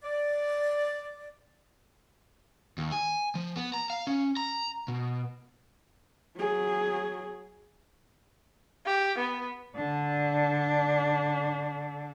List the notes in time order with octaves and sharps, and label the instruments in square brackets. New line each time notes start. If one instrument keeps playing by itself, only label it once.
[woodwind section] D5
[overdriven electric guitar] D#2
G#5
F3
B3
A#5
F5
C#4
A#5
B2
[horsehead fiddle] F#3 G#4
[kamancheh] G4
B3
[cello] D3 D4